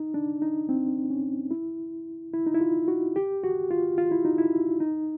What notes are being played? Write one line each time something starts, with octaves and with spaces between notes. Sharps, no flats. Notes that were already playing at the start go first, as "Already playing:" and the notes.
Already playing: D#4
D4
D#4
C4
C#4
E4
E4
D#4
E4
F4
F#4
G4
F#4
F4
F4
E4
D#4
E4
D#4